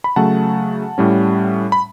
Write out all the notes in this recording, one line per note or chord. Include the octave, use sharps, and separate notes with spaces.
B5
C#3 F#3 A3 F#5 A5
A2 G3 C#4
B5